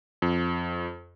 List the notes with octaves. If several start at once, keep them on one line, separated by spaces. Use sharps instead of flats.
F2